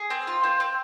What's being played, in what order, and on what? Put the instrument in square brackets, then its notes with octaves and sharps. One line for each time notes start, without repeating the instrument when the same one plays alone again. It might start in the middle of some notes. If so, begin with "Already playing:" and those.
Already playing: [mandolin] G#4
C4
F4
C4
C4